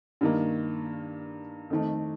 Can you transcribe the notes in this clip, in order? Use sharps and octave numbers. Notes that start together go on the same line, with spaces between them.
G2 D#3 A#3
F2 D#3 A3